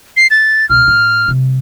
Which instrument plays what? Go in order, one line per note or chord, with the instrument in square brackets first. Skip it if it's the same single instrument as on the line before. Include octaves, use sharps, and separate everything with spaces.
[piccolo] C7
A6
[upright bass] C#2 B2 [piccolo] F6
[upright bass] A2
C3 G3